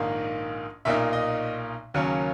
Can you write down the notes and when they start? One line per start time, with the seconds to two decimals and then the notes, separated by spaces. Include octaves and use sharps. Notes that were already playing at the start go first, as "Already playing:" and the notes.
Already playing: A#1 G#2 D#3 A#3 D#4
0.85 B1 A#2 A#3 D#4 E5
1.13 D#5
1.94 D#2 C#3 F#3 A#3 C#4